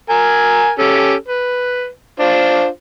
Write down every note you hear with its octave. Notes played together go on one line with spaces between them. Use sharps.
A#4 G#5
C#4 G4 A4
B4
D4 F4 C5